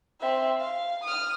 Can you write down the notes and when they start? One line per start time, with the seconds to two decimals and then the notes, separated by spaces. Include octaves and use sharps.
0.20 C4 E5
0.60 F5
1.04 D#6 F6